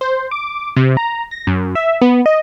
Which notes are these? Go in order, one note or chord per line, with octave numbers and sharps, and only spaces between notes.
C5
D6
C3
A#5
A#6
F#2
E5
B3
D#5